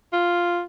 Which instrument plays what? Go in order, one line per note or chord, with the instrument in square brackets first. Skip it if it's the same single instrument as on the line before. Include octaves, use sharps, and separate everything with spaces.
[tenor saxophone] F4